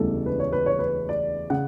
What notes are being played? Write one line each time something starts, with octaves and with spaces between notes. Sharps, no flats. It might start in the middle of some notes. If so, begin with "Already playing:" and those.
Already playing: E1 D2 C#3 E3 G3 A4
B4
C#5
B4
C#5
B4
D5
C#3 F#5